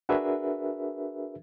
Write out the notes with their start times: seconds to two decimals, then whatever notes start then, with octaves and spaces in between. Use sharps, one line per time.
0.09 D4 F#4 G#4 A#4 B4 E5